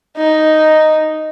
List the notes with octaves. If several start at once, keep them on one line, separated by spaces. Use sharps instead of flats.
D#4